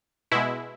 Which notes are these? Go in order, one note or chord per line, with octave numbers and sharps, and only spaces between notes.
B2 G#3 E4